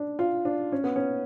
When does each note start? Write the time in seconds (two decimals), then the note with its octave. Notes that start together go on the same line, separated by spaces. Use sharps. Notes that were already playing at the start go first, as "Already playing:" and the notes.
Already playing: D4
0.19 F4
0.45 D4
0.72 C#4
0.84 B3
0.96 C#4